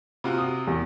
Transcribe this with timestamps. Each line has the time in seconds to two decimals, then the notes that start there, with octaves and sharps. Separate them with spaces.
0.24 C3 F4 F#4
0.38 D#6
0.67 E2